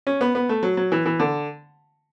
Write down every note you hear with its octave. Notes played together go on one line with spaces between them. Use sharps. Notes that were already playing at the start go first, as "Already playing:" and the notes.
C#4
B3
B3
A3
F#3
F#3
E3
E3
D3